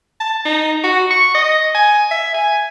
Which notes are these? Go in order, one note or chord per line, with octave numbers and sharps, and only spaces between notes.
A5
D#4
F#4
C#6
D#5
G#5
E5
G#5